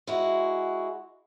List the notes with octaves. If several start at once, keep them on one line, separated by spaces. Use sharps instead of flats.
G#3 E4 F#4